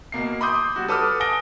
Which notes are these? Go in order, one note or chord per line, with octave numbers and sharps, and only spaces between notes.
B2 A#3 C7
B5 C6 D6 D#6 G6
G3 F#4
A4 B4 A5 D6 D#6 F6
G#5 A5 D#6 A#6 D7 G7